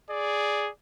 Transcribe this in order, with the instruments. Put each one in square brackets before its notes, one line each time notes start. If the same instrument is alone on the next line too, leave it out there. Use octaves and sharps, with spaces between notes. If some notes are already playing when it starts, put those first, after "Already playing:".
[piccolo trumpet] G#4 [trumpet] D5